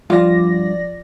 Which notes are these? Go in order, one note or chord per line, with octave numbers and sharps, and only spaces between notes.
G2 F3 F4 D5 F5 A#6